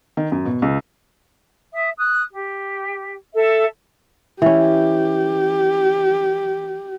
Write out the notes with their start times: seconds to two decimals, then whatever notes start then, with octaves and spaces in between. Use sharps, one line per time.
0.17 D#3
0.32 F#2
0.45 B2
0.62 C#2
1.73 E5 D#6
1.98 D#6 F#6
2.32 G4
3.33 A4 E5
4.42 E3 C#4 G4